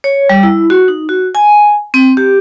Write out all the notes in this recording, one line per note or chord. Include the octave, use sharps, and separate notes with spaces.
C#5
G3
E4
F#4
D#4
F#4
G#5
C4
G4